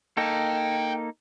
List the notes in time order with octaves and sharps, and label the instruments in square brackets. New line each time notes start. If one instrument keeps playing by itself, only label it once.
[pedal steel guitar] A#3 D#4 A4 [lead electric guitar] G5 A#5